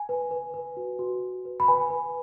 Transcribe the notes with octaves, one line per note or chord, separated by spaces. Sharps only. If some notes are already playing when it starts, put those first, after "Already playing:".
Already playing: G#5
B4
B4
B4
F#4
F#4
F#4
B4
B5
B4 G#5
B4